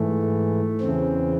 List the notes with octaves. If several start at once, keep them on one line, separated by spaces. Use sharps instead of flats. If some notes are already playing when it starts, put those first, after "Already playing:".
Already playing: G#2 E3 A3
E2 C#3 E3 C4